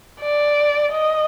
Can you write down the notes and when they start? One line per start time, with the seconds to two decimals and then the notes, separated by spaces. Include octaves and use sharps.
0.20 D5
0.92 D#5